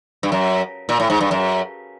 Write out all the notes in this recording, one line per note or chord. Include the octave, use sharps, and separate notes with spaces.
G2
F#2
A#2
A2
G#2
G2
F#2